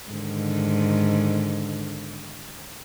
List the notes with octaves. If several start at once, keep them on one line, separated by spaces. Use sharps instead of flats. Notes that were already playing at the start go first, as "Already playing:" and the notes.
G#2 D3 D#3